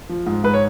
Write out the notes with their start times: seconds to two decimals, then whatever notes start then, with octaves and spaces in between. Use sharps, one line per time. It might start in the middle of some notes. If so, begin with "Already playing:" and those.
0.09 F3
0.26 G#2
0.44 G#2 B4
0.54 C#5